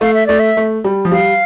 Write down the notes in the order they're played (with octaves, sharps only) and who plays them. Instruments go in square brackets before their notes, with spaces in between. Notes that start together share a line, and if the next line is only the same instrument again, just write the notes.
[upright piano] A3 [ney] F5
[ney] E5
[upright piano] A3 [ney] D5
[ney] E5
[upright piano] A3
G3
F3
[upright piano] G3 [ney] F5